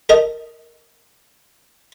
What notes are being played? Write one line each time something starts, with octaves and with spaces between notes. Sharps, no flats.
A4 A#4 D#5